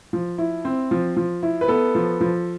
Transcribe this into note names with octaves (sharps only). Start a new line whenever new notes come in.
F3
E4
C4
F3
F3
E4
B4
B3 A4
F3
F3